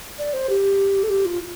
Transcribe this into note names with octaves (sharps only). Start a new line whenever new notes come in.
D5
C5
G4
A4
G4
F4